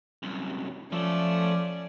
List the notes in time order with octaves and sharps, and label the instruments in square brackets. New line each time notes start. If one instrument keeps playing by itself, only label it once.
[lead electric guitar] C2 F#2
[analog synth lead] F3 [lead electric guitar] A3 A4 [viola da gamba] C#4 D5